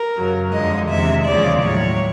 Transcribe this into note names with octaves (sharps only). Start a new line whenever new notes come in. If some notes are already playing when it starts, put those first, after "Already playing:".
Already playing: A#4
F#2 C#3 F#3
F2 D3 F3 G#3 D#5
E2 C3 D#3 G#3 E5
D#2 C#3 F3 G#3 D5
A2 F#3 C#5